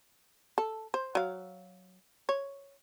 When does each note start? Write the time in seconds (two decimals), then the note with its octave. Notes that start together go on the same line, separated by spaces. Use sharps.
0.58 A4
0.94 C5
1.15 F#3 F5
2.29 C#5